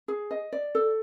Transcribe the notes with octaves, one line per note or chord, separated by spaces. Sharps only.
G#4
D#5
D5
A4